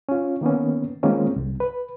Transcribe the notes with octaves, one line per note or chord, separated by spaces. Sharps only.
C#4 F4
D#3 A#3 B3 C#4
D#3 G#3 A#3 C4 C#4 F4
C2
B4